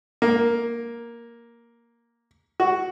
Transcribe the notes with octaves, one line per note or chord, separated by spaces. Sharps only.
A#3
F#4